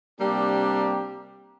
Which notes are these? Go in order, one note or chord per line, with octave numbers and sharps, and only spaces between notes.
C3 G3 A#3 D4 G4